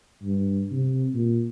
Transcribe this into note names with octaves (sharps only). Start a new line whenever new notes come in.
G2
C3
A#2